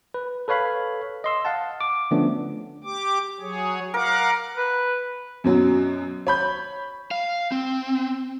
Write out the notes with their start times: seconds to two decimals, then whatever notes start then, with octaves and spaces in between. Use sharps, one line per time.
0.14 B4
0.48 A4 B4 C#5 F5 B5
1.24 D#5 C6 E6
1.45 F5 F#5 A5
1.81 D6
2.11 D3 F3 A3 B3 C#4 D4
2.84 G4 D6
3.40 F#3 G#4 C#5
3.94 A#4 F5 F#5 D6
4.57 B4
5.44 F#2 B2 F#3
6.27 C#5 B5 G6
7.11 F5
7.52 C4